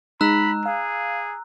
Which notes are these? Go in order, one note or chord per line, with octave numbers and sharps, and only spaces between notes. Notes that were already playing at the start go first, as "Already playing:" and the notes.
G#3 D#4 A#5 B5 E6 F#6
G#4 F5